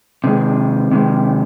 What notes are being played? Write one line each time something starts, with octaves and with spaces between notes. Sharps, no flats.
C3 D#3 G#3
C3 D#3 G#3